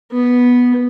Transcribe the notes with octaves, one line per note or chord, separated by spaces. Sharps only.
B3